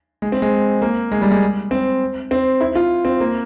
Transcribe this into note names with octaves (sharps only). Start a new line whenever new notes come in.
G#3
C4
G#3
A#3
G#3
G3
G#3
C4
C4
E4
F4
C4
A#3